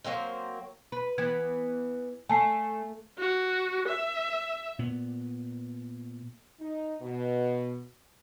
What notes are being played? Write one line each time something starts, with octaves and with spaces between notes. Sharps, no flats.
F#3 A#3 C4 C5
B4
E3 B3 G#6
A3 G#5 A5 C7
F#4
E5
A#2 B3
D#4
B2